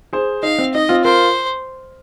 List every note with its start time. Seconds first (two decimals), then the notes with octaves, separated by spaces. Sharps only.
0.13 G#4 C5
0.43 D#4 F5
0.58 C4
0.74 D#4 D#5
0.89 C4 F4
1.04 F4 A#4 C5